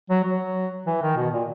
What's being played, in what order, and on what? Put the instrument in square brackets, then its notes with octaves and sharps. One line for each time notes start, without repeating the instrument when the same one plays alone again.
[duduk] F#3
F#3
E3
D#3
B2
A#2